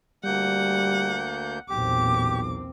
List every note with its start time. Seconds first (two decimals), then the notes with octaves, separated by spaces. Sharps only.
0.25 D2 G3 A#3 F#5 G6
1.70 B1 E2 A#2 C4 G4 D6